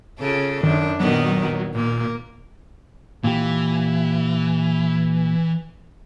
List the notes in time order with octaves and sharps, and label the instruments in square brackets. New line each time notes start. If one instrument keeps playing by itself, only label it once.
[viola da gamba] C#3 F4 A4
[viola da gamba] F#2 D4 [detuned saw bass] D#3
[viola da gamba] A#2 D#3 B3 [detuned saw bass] F#3
[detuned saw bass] A#2 [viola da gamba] A#3
[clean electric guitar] A#2 G4 [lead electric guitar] E3